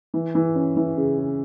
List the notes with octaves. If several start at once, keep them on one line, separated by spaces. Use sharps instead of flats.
E3
E3
C#4
E3
C#3
C#3